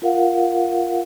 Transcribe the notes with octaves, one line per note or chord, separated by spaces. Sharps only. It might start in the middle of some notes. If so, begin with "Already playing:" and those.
F4 A#4 F5 F#5